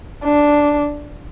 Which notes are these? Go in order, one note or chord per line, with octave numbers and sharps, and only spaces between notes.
D4